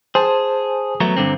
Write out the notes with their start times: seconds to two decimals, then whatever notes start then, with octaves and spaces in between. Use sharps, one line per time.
0.15 G#4 C5 G#5 A5
1.00 F#3 A3 B3 A#5
1.17 G2 D3 C4